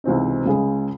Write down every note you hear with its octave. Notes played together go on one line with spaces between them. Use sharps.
C#2 C3 E3 C4 D#4
C#2 C#3 G#3